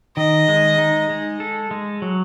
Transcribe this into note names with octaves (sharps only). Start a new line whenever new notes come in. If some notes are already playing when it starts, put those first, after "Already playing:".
D#3 D#5
G#3
D#4
G#3
A4
G#3
F#3